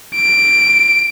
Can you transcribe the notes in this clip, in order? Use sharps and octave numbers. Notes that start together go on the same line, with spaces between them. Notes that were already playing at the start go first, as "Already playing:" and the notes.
D7